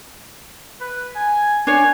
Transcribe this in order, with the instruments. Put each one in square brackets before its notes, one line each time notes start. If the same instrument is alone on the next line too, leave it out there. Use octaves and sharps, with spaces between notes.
[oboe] B4
G#5
[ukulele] D4 C#5 [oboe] G#5